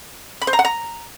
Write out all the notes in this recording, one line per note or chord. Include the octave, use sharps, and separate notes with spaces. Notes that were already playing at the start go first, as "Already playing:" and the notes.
B5
C5
A#5
F#5
A#5